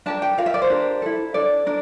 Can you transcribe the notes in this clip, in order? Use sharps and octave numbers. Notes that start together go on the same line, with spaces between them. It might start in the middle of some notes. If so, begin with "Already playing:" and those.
D4 G4 A#4 A5
G5
F4 A#4 F5
E5
D5
C5
D4 G4 A#4
E4 A4
D4 A4 D5
D4 A#4